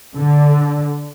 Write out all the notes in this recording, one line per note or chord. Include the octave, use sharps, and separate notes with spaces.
D3